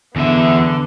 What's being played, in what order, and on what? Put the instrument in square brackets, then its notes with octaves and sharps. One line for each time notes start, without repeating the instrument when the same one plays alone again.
[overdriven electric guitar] E2 E5 [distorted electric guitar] D3 [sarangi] B3